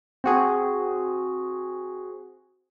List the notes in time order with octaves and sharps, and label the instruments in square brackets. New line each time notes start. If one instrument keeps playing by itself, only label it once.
[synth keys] C4 F#4 G#4